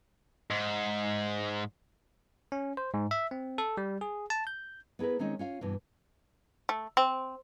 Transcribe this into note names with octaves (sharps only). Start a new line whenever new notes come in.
G#2
C#4
C5
G#2
E5
C4
A4
G3
G#4
A5
G6
B3 E4 G#4 A#4 B4
D#3 G#3 C4 C#4 D#4
C#4 F4 F5
G2 B2 E3
A3
C4